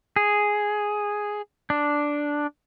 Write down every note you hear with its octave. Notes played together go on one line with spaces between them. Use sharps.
G#4
D4